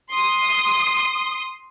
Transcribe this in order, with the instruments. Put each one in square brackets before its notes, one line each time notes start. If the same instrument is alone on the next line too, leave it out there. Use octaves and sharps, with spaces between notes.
[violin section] C6 D#6